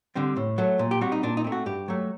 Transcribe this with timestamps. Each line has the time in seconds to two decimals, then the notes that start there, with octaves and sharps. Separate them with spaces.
0.15 D3 G3 C4
0.37 A2
0.58 F#3 A3
0.79 A#2
0.91 G4
1.01 G3 C4 F#4
1.12 D#4
1.23 A#2 D4
1.37 D#4
1.44 A3 C4
1.52 F#4
1.66 G2 G4
1.88 F#3 A3